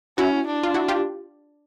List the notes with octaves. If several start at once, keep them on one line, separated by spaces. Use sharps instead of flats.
C#4 E4 F#4
D4
F4
E4 F#4
F4 G4